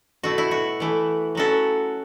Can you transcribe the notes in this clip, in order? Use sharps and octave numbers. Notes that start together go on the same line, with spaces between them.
B2 A3 E4 F#4
E4
F#4
E3 A3 E4
F#3 C#4 E4 F#4 A4